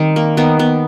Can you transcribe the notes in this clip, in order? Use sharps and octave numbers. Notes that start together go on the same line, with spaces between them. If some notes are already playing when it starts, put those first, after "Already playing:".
Already playing: D#3 G3 C4
A#3
D#3 B3
B3